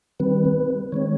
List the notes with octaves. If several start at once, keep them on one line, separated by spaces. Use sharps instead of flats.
D#3 G3 C4 B4
D#3 G#3 C4 C#5